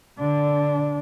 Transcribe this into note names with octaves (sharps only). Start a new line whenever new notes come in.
D3 D4